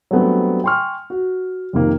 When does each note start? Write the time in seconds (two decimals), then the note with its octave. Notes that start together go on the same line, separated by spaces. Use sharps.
0.11 F#3 G3 A3 B3 C4 D4
0.64 G5 G#5 C6 C#6 F6
1.10 F#4
1.73 F2 C3 D#3 A#3